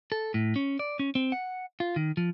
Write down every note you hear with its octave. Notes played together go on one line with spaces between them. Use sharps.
A4
A2
C#4
D5
C#4
C4
F#5
F4
D#3
F3